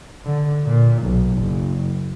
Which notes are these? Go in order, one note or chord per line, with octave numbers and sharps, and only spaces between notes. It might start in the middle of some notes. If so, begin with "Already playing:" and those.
D3
A#2
B1
F#1